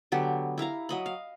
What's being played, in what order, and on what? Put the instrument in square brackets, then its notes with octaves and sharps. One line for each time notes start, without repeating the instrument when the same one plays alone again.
[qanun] D3 F#3 B3 G4
E4 A#4 F5 A#5
F#3 D#5 B5
F5